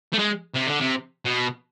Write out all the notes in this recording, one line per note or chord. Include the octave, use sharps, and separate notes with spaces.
A3
G#3
C3
D3
C3
B2